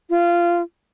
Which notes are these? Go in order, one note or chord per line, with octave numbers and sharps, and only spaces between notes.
F4